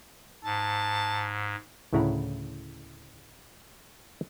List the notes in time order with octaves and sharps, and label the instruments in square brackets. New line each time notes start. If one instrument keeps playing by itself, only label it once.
[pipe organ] G#2 [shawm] A5
[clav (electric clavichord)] D2 A2 C#3 E4 F#5 A#5